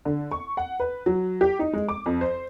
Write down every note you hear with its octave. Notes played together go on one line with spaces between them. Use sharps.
D3
C#6
F#5
B4
F#3
G4
D#4
G#3
D6
F2
C5